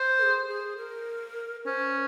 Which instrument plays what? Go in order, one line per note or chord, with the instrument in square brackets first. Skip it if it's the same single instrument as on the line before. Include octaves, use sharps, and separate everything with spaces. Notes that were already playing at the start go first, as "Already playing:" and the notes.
Already playing: [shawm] C5
[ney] A#4
G#4
G#4
A#4
[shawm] C#4 [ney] C5